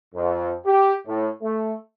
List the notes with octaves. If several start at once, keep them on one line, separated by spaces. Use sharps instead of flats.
F2
G4
A2
A3